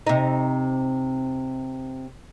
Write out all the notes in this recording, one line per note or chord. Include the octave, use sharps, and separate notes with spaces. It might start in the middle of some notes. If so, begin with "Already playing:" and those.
C3 D#4